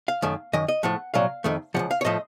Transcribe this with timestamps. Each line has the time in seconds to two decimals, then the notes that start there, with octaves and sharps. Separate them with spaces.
0.08 F5
0.22 F#2 D#3 A3
0.53 F#2 D#3 D#5
0.68 D#5
0.83 A2 F3 A3 F#5
1.14 C2 A#2 F#3 F5
1.44 F2 D#3 A3
1.74 C3 F3 F#5
1.79 C#2
1.91 F5
2.01 C#5
2.05 A2 F3 A3 D#5